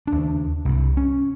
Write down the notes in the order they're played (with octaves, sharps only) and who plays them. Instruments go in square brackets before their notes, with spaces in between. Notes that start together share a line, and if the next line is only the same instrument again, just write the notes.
[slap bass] D#2 D4
C2 G2
C#4